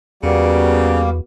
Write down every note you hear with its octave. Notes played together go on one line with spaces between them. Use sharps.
E2 C#3 G3 A#3 B3 F#4